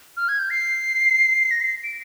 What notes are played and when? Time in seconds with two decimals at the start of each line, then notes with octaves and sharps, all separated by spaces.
0.17 F6
0.29 G#6
0.39 G6
0.50 C7
1.51 A#6
1.61 C7
1.84 D7